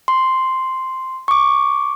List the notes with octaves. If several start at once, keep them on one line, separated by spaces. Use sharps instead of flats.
C6
C#6 D6